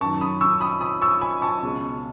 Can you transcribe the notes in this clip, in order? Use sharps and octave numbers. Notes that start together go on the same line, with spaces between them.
F#2 D#3 F#3 A5 C#6
B5 D#6
C#6 E6
B5 D#6
B5 D#6
C#6 E6
G#5 B5
A5 C#6
C#2 B2 G#3